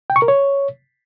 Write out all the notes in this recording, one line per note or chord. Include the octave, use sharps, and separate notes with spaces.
G5
C#6
A#4
C#5